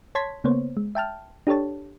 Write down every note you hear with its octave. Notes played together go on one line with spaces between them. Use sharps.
C#5 A5 C6 G#6 B6
C#3 A#3 B3 C5 C#5
G#3
E5 G5 A5 F6
D4 G4 A4 C#5 A5